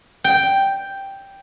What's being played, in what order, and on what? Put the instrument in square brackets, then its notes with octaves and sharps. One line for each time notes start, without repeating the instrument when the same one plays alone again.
[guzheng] G5